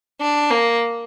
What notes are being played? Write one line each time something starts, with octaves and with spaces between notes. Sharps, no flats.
D4
A#3